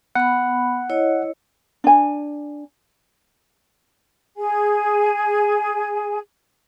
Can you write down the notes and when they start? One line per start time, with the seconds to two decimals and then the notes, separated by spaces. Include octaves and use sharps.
0.15 B3 F#5 B5
0.90 E4 C#5 D#5
1.84 D4 G#5
4.37 G#4 G#5